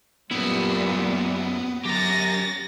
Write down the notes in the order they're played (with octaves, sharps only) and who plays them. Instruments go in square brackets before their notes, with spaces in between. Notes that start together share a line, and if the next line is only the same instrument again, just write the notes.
[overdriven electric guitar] F#2 E4 [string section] A#2 G3 [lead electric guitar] B3
[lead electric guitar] F#2 [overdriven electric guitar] G4 A#5 [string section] A6 A#6